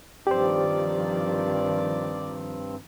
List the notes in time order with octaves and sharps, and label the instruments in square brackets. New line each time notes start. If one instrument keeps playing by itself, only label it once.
[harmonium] G2 C4 [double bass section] D#3 F3 [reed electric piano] G4 C5 [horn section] D5